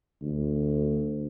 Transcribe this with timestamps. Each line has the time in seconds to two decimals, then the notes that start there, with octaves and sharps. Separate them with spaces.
0.21 D2